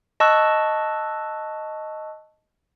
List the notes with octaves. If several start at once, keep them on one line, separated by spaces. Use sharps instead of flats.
D#5 A5 C#6 E6 F#6